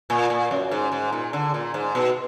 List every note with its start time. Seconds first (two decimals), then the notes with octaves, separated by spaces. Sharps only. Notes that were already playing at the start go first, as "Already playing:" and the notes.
0.10 A#2
0.30 A#2
0.51 F#2
0.71 G#2
0.92 G#2
1.13 A#2
1.33 D3
1.54 A#2
1.74 G#2
1.95 B2